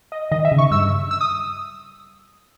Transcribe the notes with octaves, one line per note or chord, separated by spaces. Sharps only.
D#5
D#3 D#5
E5
C#3
C#6
G2 E6
E6
D#6